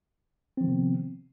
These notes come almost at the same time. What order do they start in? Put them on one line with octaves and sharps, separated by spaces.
C4 F3 D#3 C3 B3